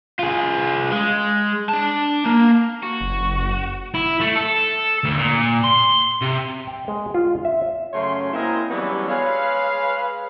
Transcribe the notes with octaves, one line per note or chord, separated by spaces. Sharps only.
F4 G#4
G#3
D4 A5
A#3
F#4
F#1
E4
A3
A4
D2
A#2
C6
C3
G5
G#3
F4
E5
F#2 C#3 A3 C#5 C6
G#3 A#3 C4 E4 A#4 D#5
E3 F#3 G3 B3 C#4 D4
G#3 G#4 B4 C#5 F5